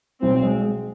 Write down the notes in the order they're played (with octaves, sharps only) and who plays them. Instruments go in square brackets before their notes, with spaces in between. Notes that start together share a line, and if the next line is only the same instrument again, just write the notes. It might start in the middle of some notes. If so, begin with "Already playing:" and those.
[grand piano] B1 [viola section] C4
[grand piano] G#3
G#3